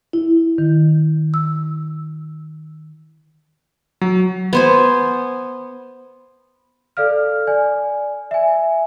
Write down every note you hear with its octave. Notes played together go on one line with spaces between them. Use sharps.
E4
D#3
E6
F#3
B3 C5 G#5
A4 D5 F5 F6
D5 G#5
E5 G#5